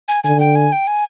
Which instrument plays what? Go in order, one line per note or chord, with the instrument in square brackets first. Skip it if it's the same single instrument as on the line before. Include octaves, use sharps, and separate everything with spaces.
[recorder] G#5
[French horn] D3 [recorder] G#5
[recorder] G5
G#5
G5
G#5